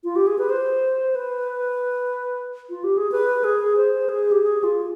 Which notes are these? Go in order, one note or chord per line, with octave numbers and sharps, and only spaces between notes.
F4
G4
G#4
B4
C5
B4
F4
G4
G#4
B4
G#4
C5
G#4
G4
G#4
F4